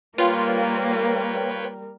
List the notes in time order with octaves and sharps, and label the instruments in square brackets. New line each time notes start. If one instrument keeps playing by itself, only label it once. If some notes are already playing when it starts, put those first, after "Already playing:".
[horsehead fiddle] G3 A#4 [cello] A#3 [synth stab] F4 [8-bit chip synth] B4 C#5 G5